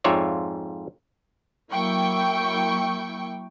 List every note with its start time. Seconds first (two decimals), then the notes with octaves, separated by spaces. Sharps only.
0.04 F2 G#2 F4 C#5 D5 E5
1.73 F#3 A#3 E4 G5 C#6